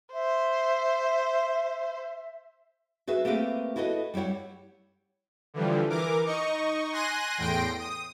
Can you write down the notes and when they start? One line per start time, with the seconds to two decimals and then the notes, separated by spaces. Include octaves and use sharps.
0.13 C5 E5
3.07 F#4 G#4 B4 E5
3.25 A3 A#3 C4 G4 B4
3.76 E4 F#4 A4 B4 D#5
4.14 G3 E4 G4 C#5 F#5
5.54 D3 E3 F3 G3
5.90 E3 A#4 D6
6.26 D#4 D#5 C#6
6.92 G#5 C6 F#6 A#6 D#7
7.38 E2 A2 G5 C6 A#6 D7
7.78 D#6